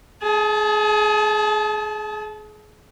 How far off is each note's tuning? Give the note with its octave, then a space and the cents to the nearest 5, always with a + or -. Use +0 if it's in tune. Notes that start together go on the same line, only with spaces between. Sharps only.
G#4 +25 A5 -25